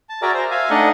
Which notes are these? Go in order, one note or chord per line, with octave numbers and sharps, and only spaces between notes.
A5
F#4 G#4 A#4 D5 E5 A#5
C5 A#5
E5 F5 G#5
A3 D4 D#4 D#5 F#5